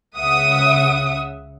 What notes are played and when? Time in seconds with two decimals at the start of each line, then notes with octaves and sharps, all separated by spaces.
0.17 C#2 C#3 E5 F#5 D#6